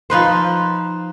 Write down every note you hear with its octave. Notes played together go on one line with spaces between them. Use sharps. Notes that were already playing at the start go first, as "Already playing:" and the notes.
F3 D#4 B4 C5